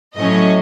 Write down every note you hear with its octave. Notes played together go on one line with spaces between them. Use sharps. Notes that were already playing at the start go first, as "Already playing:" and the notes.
A2 F#3 A3 C#4 D#5